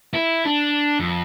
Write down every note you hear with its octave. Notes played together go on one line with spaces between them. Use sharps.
E4
D4
F2